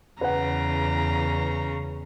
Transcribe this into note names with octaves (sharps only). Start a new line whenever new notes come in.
E2 C#3 B4 F#5 A#5